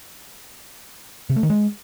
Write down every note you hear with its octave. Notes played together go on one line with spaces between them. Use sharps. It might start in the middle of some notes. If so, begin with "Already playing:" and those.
C3
A3
D#3
G#3